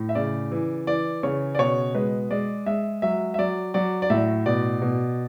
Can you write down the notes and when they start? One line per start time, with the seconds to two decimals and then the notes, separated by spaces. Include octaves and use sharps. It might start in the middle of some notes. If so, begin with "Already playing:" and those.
Already playing: A2
0.09 E5
0.15 C#3 D5
0.52 E3
0.87 E3 D5
1.23 C#3 C#5
1.55 D5
1.59 B2 C#5
1.95 G#3 B4
2.31 G#3 D5
2.66 G#3 E5
3.02 F#3 E5
3.34 E5
3.38 F#3 D5
3.74 F#3 D5
4.02 D5
4.10 A2 E5
4.46 B2 D5
4.82 B2